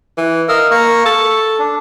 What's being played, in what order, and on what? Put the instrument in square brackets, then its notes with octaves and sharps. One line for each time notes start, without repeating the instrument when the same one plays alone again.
[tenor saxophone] E3
[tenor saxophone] A#4 [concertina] D#5 F5 E6
[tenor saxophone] A#3 [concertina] C#6
[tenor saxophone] A4
[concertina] D4